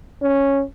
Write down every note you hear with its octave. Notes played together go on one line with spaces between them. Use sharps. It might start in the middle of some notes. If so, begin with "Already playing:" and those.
C#4